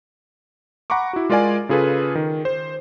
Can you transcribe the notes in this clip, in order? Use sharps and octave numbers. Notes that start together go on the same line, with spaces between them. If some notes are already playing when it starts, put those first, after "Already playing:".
F#5 A#5 B5 C#6 D6
E4 F#4
G#3 F4 A#4 D5 F5 G#5
C#3 F4 G#4 A4 B4
D#3
C5